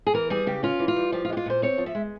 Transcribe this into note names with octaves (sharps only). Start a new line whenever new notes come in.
G#4
E3 A#4
G3 G#4
C#3 G4
C#4 F4
E3
F4
G3
F3 G4
F4
G#3 G4
F4
A#2 C5
C4 C#5
F3
E5
G#3